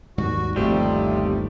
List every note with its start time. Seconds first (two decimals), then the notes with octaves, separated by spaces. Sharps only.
0.18 D#2 G#2 G3 F#4
0.56 G1 D#2 C3 F3 G3 A3 C4